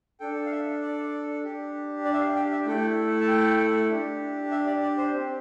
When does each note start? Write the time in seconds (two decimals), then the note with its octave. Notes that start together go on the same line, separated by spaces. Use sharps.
0.20 D4 A4 G5
0.46 F5
0.51 E5
0.82 D5
1.43 D4 G4
2.05 D5
2.14 E5
2.20 F5
2.36 G5
2.51 E5
2.66 A3 E4 A4 G5
3.21 A5
3.28 G5
3.90 D4 G4
4.51 E5
4.67 D5
4.82 D5
4.98 C5
5.13 C4 G4